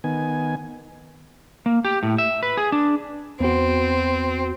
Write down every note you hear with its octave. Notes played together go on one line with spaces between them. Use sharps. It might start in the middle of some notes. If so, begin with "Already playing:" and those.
D#3 B3 G#5
A#3
G4
A2
E5
B4
G#4
D4
E2 B3 C4 F#4